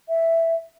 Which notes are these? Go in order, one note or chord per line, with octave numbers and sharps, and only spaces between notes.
E5